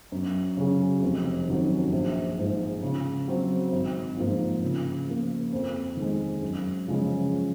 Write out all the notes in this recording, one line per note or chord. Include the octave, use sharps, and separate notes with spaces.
F#2
C#3 F#3 C#4 G#4
F1
F2 D#3 F#3 C#4
A#1
G#2 F3 G#3
C#3
F#3 C4
G#1
G#2 F3 A#3 F4
C#3
F3 A#3
F2
D#3
G#3
F#2
C#3 F3 G#3 C#4